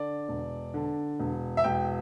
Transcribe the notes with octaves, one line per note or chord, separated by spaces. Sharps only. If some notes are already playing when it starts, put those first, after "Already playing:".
Already playing: D3 D5
E1
D3
E1
E5
E1 G5